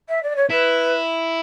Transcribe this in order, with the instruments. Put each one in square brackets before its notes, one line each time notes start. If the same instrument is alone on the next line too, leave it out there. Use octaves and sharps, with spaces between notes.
[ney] E5
D5
C#5
[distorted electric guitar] E4 [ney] B4